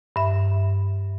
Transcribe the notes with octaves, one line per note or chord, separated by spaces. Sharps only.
G2 E5